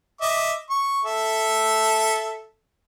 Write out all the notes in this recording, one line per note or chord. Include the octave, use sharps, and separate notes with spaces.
D#5 E5 D6
C#6
A4 E5